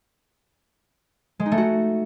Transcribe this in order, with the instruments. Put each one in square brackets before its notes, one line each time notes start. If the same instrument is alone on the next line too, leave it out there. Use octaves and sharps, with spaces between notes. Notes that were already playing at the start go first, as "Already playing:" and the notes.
[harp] G#3
D#4
A3
F#4